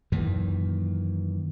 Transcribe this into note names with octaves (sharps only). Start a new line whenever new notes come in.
F#2 A#2 D#3 E3